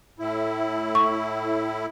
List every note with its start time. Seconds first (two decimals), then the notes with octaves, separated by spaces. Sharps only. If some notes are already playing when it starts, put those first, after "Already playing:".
0.19 A2 E4
0.95 C#6